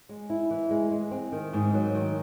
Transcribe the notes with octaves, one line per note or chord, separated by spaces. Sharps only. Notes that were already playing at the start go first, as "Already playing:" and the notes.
G#3
E4
E3
G#3
G#3
C4
D#3
G#2
F#3
D#3